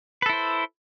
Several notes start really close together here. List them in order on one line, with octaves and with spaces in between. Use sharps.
B4 A4 E4 C5